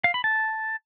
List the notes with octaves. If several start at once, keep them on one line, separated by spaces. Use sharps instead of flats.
F5
B5
A5